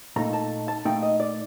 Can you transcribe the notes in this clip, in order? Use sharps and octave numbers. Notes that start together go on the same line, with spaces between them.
A#2 A3 D#4 A#5
A5
A5
A#2 A3 D#4 G5
D#5
D5